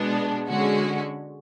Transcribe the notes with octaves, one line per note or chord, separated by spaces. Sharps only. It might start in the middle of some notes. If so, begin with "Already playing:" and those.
Already playing: B2 G#3 B3 D4
D3 G#3 C#4 F#4